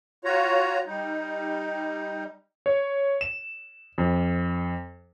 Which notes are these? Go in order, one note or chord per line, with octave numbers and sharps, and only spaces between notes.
F4 F#4 C#5 A#5
G3 D#4
C#5
E7
F2